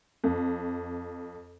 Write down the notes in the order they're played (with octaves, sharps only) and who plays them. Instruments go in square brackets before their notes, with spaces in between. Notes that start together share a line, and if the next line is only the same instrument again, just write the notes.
[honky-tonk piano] F2